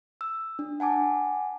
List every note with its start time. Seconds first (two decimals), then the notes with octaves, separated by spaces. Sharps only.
0.21 E6
0.59 D4
0.80 F#5 G#5 A5 D6